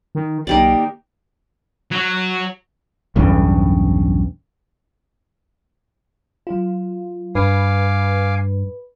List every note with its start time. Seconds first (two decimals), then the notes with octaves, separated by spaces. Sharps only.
0.15 D#3
0.47 B1 D#3 A#3 D#4 G4 D5
1.92 F#3
3.16 B1 E2 G2 C#3
6.47 F#3 F4
7.35 G2 B4 F5 G#5 D6